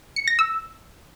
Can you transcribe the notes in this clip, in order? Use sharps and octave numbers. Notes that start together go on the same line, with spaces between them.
C#7
A#6
E6